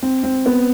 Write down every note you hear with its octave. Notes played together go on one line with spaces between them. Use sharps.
C4
C4
B3